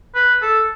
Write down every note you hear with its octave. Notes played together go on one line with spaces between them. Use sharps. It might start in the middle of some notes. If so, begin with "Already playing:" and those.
B4
A4